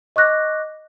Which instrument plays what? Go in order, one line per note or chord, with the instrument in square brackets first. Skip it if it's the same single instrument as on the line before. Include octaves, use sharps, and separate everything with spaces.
[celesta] D#5 C#6 D6 F#6 A#6